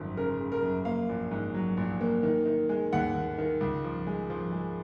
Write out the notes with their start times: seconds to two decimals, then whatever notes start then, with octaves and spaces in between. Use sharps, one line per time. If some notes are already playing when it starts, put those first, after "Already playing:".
Already playing: G#1 F#2 F3
0.17 C#3 A#4
0.40 C#3
0.52 A#4
0.62 F#2
0.85 A#3 F5
1.09 A#1
1.31 G#2
1.54 F#3
1.77 A#1
2.01 A#3
2.23 D#3
2.46 D#3
2.69 G#3
2.93 D#2 F#5
3.15 D#2
3.38 D#3
3.61 C#2
3.84 F3
4.07 G#3
4.30 F3
4.52 G#3